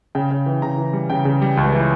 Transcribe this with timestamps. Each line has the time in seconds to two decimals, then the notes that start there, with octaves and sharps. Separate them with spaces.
0.15 C#3 G5
0.31 C#3
0.46 E3
0.62 C#3 A#5
0.78 E3
0.93 G3
1.10 C#3 G5
1.25 C#3
1.42 G3
1.57 C#2
1.73 E3